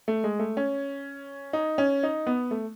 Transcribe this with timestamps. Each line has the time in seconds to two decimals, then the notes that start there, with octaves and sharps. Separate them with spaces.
0.08 A3
0.24 G#3
0.39 A3
0.57 C#4
1.53 D#4
1.78 C#4
2.03 D#4
2.27 B3
2.51 A3